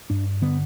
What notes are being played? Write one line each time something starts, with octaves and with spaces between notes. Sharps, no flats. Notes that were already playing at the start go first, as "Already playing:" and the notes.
G2 D4
D3 B3